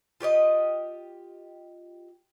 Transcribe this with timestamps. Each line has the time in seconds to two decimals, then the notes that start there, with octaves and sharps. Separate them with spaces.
0.21 F4 G4 C#5 D#5